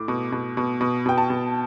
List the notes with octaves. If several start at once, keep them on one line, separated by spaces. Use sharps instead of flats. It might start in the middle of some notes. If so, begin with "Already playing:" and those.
Already playing: A2 D6
B2
B2
B2
B2
B2 G5
A5
B2